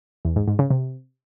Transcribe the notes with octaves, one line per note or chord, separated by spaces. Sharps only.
E2
G#2
G#2
C#3
C3